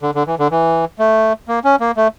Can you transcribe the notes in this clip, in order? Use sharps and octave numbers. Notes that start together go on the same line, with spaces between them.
D3
D3
E3
D3
E3
A3
A#3
C#4
A#3
A3